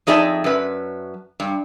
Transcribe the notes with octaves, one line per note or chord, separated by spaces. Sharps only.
F2 D#4 G#4 D5 E5 A5
F#2 B4
G2